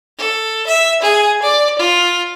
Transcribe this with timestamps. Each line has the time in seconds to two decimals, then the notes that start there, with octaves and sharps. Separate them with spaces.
0.18 A4
0.67 E5
1.02 G#4
1.42 D5
1.79 F4